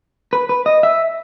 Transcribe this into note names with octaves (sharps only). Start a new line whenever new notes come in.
B4
B4
D#5
E5